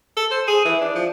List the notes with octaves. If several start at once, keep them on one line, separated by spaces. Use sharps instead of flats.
A4
C5
G#4
E3
D4
F3